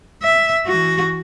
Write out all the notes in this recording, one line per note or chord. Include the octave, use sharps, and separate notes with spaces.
E5
E3 F#4